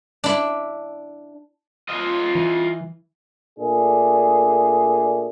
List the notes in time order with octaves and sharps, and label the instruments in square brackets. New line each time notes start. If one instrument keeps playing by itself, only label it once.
[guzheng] D4 E4
[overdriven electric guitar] F4 D#5
[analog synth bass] E3
[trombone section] A#2 A3 D4 G#4